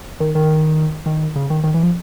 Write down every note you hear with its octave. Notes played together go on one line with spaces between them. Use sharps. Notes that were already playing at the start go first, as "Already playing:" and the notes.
D#3
D#3
D#3
C#3
D#3
D#3
E3
F3